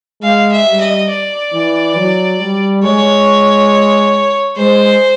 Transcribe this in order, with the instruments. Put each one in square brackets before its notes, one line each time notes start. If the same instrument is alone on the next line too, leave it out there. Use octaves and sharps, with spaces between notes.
[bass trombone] G#3 [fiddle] F5
[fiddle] E5
[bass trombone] G3
[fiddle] D#5
D5
[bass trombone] E3
F#3
G3
[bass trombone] G#3 [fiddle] C#5
[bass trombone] G#3 [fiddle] C5